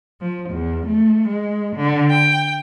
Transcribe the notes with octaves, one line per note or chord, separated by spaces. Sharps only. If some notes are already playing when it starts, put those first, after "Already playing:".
F3
E2
A3
G#3
D3
G5